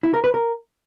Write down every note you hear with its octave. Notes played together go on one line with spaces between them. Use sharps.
E4
A#4
B4
A#4